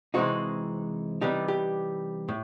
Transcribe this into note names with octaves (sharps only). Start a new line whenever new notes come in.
C3 E3 G#3 C4 D#4 F#4
C3 E3 G3 B3 D#4 G4
G4
A2